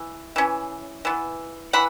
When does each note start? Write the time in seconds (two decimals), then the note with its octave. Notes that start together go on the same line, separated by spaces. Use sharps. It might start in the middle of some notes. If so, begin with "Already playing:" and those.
Already playing: E3
0.36 E3 C#4
1.05 E3 B3
1.73 E3 F#5 B5